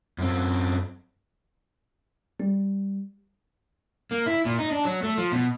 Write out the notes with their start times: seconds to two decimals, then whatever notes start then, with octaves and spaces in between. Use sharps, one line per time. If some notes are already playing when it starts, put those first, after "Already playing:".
0.18 F#2 C4
2.39 G3
4.11 A#3
4.26 E4
4.45 A#2
4.58 D#4
4.72 D4
4.85 F#3
5.03 A3
5.18 F3
5.32 B2